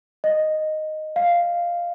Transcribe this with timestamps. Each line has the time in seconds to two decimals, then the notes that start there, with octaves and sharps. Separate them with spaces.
0.24 D#5
1.16 F5